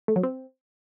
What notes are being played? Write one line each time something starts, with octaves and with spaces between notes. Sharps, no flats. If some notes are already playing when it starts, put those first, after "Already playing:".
A3
F#3
C4